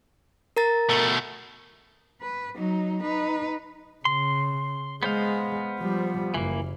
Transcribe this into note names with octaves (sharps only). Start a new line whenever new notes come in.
A#4 A#5 A6
B2 A3
B4
F#3 D#4
D#4 B4
C#3 C6
G#3 B3 C5 F5
F3 G3
F#1 E3 A#3